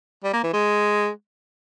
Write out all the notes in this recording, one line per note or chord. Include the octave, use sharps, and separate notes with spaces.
G3
A#3
E3
G#3